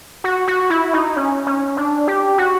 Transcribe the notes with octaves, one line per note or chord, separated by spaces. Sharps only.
F#4
F#4
E4
D#4
C#4
C#4
D4
G4
F#4